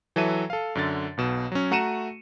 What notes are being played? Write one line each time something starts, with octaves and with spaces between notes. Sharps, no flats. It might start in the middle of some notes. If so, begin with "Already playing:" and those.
E3 F#3 A4 E5 D#7
A4 F5
F#2 D3 A6
B1 B2 E7
F#3 C#4
A3 F#4 A#5 C#7 D#7 E7